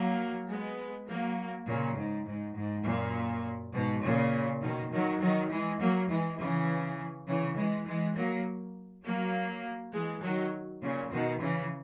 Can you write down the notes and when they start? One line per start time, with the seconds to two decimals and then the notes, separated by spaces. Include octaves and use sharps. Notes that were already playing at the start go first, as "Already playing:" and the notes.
Already playing: F#3 A#3
0.49 G#3 B3
1.08 F#3 A#3
1.67 A#2 C#3
1.96 G#2
2.26 G#2
2.55 G#2
2.84 F#2 A#2
3.73 G#2 B2
4.03 A#2 C#3
4.61 B2 D#3
4.92 D#3 F#3
5.20 D#3 F#3
5.50 E3 G#3
5.80 F#3 A#3
6.09 E3 G#3
6.39 C#3 E3
7.27 C#3 E3
7.56 E3 G#3
7.86 E3 G#3
8.16 F#3 A#3
9.04 F#3 A#3
9.93 E3 G#3
10.22 D#3 F#3
10.82 A#2 C#3
11.11 B2 D#3
11.40 C#3 E3